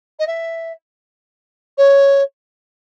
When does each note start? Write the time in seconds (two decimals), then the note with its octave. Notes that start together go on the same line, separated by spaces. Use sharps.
0.20 D#5
0.27 E5
1.78 C#5